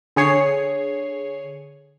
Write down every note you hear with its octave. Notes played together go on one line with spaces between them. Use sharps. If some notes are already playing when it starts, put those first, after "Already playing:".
D3 G#4 C#5 C7